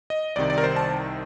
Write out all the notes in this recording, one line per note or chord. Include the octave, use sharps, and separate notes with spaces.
D#5
C2 C3 D#3 D5
D5
A#4
C5
A5